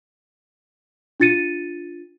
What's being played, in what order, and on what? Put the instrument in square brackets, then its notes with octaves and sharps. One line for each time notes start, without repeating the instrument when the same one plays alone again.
[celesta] D4 F4 A6 C#7 D#7